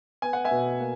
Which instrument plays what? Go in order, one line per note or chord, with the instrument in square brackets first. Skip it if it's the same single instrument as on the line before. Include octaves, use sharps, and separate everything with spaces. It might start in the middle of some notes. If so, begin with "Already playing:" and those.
[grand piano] B3 G#5
F#5
E5 G#5
B2
A#3